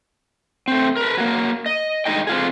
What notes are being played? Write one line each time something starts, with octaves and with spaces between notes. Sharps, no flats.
A3 C4
A#4 B4
F#3 A#3
D#5
G2 G#3 A3 D#4 D#5 G5
C4 F4 G#4